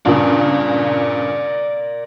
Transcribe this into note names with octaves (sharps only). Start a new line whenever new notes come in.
G2 A#2 C#3 A#4 D5